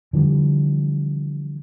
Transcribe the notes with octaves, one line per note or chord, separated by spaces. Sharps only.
D3 E3 F3 G3